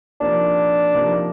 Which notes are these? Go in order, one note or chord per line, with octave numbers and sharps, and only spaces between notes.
C3 F3 A#3 D4 D#4 A#4
C3 F3 A#3 D#4 A#4